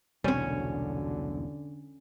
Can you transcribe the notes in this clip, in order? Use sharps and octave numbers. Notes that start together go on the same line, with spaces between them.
E1 C2 B2 D3 G3 C4 C#4 C#5